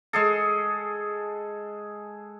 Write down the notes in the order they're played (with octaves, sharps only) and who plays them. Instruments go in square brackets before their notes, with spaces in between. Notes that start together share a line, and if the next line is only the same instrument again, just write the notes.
[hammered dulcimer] G#3 G#4 A4